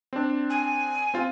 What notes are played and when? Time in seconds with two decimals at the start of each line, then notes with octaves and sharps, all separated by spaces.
0.13 C4 D4
0.50 G#5
1.14 C4 F4